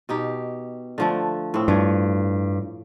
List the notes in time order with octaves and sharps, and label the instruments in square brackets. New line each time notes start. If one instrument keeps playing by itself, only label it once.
[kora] B2 D#4 G4
D3 F3 A3
A2 C4
[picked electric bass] G2 [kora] F3 C#5